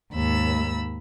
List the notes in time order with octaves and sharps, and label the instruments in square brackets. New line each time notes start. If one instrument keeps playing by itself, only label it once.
[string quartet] D#2 G#2 B5 E6